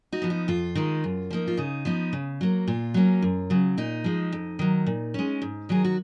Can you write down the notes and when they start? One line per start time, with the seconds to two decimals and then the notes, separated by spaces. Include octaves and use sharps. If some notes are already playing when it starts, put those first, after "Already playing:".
0.12 D#4 F#4
0.22 F3 B3
0.30 D#4
0.48 F2 F4
0.75 D#3 G#3 D#4
1.04 F#2
1.31 F3 A#3 D#4
1.48 F4
1.57 C#3 D#4
1.85 F3 B3 D#4
2.13 C#3
2.41 F#3 A#3
2.68 A#2 F4
2.94 F#3 A#3 C#4
3.22 F#2
3.50 C#3 F#3
3.78 A#2 D#4
4.04 F3 G#3
4.32 F2
4.59 D#3 F#3
4.86 A#2
5.14 G#3 C#4
5.42 G#2
5.69 D#3 F#3 G#4
5.85 F#4